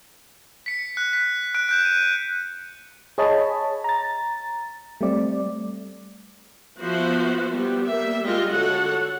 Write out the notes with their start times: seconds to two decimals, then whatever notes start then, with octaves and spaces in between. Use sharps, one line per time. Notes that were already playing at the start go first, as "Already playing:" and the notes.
0.66 B6 C#7
0.97 F#6
1.13 B6
1.55 F#6 D7
1.69 F#6 G6 E7
1.85 D#7
3.18 G#4 C#5 D#5 A5 B5
3.84 A#5 A6
5.01 G3 A3 C4 D5
6.81 F3 B3 F#4 B4 C5 E5
7.52 G3 B3
7.86 G3 A#3 E5
8.23 G3 G#3 F4 A#4 D#5
8.51 D3 F#4 A4 C#5 F#5